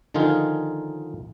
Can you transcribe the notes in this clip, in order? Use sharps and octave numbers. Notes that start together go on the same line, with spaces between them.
D3 D#3 F3 D#4 F4 G#4